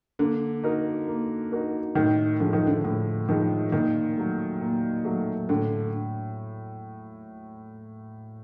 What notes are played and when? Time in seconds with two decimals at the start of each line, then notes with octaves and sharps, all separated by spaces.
0.19 D3 A#3
0.64 D#4 F#4 A#4
1.08 A#3
1.52 D#4 F#4 A#4
1.95 A2 D#3
2.40 D3 F3 G#3
2.53 D#3
2.67 D3
2.84 A2 D3
3.29 D#3 F3 G#3
3.72 A#2 D#3
4.17 F#3 A3
4.61 A#2
5.05 F#3 A3
5.49 A2 D3